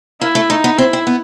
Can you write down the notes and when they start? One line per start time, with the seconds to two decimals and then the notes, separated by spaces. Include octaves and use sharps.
0.21 A#3 E4
0.35 A3
0.50 A3 D#4
0.64 B3
0.78 C4 E4
0.93 C4
1.07 B3